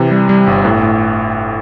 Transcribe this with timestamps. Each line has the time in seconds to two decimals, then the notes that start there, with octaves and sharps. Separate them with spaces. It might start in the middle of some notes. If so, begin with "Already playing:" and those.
Already playing: C3 E3
0.11 G3
0.29 G3
0.47 G1
0.65 A2
0.83 A2